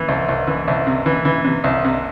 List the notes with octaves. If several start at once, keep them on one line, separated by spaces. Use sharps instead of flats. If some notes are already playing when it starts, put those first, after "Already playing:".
Already playing: E3
C2
C2
E3
C2
C3
E3
E3
C3
C2
C3